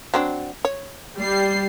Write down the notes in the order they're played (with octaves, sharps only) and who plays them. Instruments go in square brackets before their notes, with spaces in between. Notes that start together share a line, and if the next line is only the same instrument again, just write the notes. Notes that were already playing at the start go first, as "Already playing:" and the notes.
[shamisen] F#3 C4 D4
C#5
[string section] G3 C7